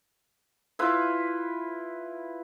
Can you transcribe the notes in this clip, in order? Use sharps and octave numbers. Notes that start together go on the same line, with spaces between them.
E4 F4 B4